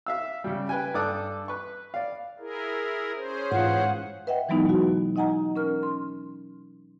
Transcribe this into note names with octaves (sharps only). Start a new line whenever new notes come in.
E5 F5 E6
C#3 G3
B4 G5 G#5
G2 A4 D5 D6 D#6 F#6
B4 C#6
D5 F5
E4 G#4 A#4
C#4 G#4 C5
G#2 E3 F4 C#5 F#5
B4 D#5 E5 F#5 G5
E3 F#3 G#3 B3 D#4 E4
B2 F#4
D#4 D#5 F#5 G#5 A#5
C#4 A#4 F6
C6